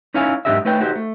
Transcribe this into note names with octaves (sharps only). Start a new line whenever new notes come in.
C#4 D#4 E4 C#5 F5 G#5
G#2 F#3 D4 G4 D#5 E5
A3 D#4 B4 C#5 G5
D#4 F#4 G4 C5
A3